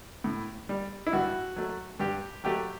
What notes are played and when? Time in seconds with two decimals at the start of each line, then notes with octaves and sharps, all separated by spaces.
0.24 A2
0.69 G3
1.07 E4
1.13 G2 F#4
1.56 F#3 A3
2.00 G2 G4
2.44 F#3 A3 G4